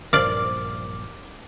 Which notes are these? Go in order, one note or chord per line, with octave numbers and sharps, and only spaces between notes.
A#1 G2 A#4 C5 D5 F5 D6